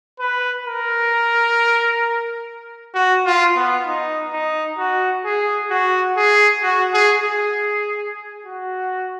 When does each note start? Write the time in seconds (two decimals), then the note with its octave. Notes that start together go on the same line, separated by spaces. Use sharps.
0.20 B4
0.66 A#4
2.94 F#4
3.25 F4
3.56 B3
3.86 D#4
4.33 D#4
4.78 F#4
5.25 G#4
5.70 F#4
6.17 G#4
6.62 F#4
6.93 G#4
7.23 G#4
8.46 F#4